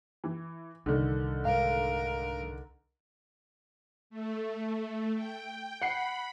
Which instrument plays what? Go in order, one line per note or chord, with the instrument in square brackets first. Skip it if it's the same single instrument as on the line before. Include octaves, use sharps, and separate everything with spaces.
[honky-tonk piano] E3
[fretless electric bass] C2 [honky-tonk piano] D3 D#3
[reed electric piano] G#2 F5 [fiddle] A#4
[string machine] A3
G5
[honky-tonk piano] F#5 C7 [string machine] B5